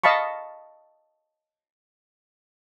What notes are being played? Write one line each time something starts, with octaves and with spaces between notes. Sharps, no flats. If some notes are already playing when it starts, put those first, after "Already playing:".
D#5 F5 A5 B5 C#6